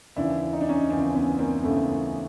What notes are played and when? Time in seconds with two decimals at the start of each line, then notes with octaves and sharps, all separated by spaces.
0.16 D#2 C#3 E3 D4 E4
0.53 D#4
0.61 D4
0.69 C#4 D#4
0.90 D#2 C#3 E3 C4 D4
1.14 B3 C#4
1.39 A#3 C4
1.63 D#2 C#3 E3 A3 B3